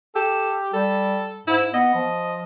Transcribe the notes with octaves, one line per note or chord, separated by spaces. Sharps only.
G4 A4
G3 A4
G#2 E4
B3 D#5
F3